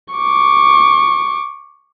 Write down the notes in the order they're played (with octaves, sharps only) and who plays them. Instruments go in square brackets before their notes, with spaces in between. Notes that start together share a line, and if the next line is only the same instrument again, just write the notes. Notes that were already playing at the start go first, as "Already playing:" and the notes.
[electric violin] C#6 D6